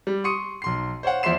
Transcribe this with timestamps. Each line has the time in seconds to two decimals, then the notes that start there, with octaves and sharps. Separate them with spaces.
0.07 G3
0.24 C6 C#6 D#6 C#7 D#7
0.62 B1 C6 C7
1.03 C5 C#5 F5 F#5
1.23 E2 F3 E5 C6 C7 E7